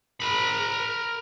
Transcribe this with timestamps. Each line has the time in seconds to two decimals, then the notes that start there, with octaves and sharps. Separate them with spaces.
0.20 A#4 B5